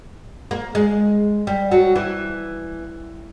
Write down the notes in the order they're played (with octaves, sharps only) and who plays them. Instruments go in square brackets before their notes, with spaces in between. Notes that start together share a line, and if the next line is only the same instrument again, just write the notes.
[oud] A#3
G#3
G3
F#3
E3